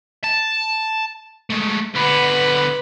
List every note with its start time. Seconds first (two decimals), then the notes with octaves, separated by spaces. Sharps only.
0.24 A5
1.50 G#3 A3
1.95 D3 B3 B4 B5